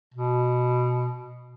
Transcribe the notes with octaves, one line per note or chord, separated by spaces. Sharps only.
B2